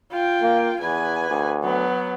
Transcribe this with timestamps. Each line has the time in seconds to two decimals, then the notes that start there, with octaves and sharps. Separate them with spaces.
0.11 F4 G5
0.42 A#3
0.80 E2 B4 G#5
1.30 D2
1.63 F#3 B3